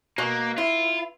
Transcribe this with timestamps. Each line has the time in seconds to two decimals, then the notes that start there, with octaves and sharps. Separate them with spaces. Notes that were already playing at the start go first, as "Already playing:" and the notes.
0.18 B2 A#3
0.58 E4 F4